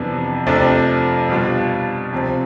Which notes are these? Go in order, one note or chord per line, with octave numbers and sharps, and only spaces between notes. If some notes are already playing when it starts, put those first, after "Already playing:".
Already playing: F2 C3 E3 B3 D4
F2 C3 F3 A3 D4
B2 G3 D4 F4
C3 F3 C4